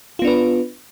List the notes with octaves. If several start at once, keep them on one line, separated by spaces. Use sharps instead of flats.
B3 D4 F4 B4